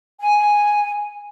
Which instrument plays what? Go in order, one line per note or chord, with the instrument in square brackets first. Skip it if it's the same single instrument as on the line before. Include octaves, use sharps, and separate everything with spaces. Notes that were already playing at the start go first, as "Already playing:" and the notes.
[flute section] G#5